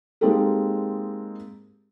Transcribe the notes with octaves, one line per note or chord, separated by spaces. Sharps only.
G#3 A#3 C4 D#4 G4 A4